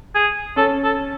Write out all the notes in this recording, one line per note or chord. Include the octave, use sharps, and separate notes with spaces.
G#4
C#4 A4
A4